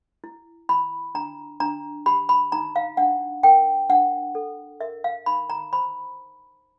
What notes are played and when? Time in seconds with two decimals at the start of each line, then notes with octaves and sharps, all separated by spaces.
0.24 E4
0.69 E4 B5
1.15 D4 A#5
1.60 D4 A#5
2.06 G4 B5
2.29 B5
2.52 D#4 A#5
2.76 F5
2.97 D4 F#5
3.43 A#4 G5
3.90 D4 F#5
4.35 A4
4.80 A#4 E5
5.04 F5
5.26 D#4 B5
5.50 A#5
5.73 C5 B5